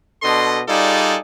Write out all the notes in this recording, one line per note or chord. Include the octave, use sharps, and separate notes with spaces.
B2 D4 A4 D#5 C6
G3 D#4 F4 G#4 A4 D5